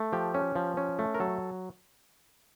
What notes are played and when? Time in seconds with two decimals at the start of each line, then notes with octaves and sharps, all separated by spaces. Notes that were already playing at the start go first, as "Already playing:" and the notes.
Already playing: A3
0.12 F3 G4
0.34 C#4
0.56 F3
0.77 C#4
0.99 A3
1.14 A#4
1.20 F#3 A4